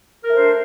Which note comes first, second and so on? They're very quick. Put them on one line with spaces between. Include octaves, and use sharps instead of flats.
A#4 A3 C5 D4